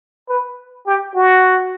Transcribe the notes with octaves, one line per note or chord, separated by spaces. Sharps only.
B4
G4
F#4